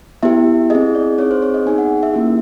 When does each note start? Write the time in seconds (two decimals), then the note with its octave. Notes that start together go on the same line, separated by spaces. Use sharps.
0.23 B3 E4 G4 E5
0.70 C4 E4 G#4 D#5
0.95 D5
1.18 C4 D#4 G#4 C#5
1.31 C5
1.42 C#5
1.54 D#5
1.66 B3 D#4 G#4 G#5
1.78 F#5
2.03 E5
2.14 A#3 C#4 E4 G4